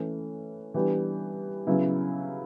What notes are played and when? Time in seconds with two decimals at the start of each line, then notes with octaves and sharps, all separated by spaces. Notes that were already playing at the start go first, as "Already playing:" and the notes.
Already playing: E3 A3 C#4
0.74 E3 G3 B3 D4 G4
1.67 C#3 F#3 B3 E4